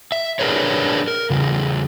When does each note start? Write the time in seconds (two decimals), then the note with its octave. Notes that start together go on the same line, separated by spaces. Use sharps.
0.12 E5
0.39 D4 G#4 A#4 B4 C#5
1.08 A#4
1.30 E2 C#3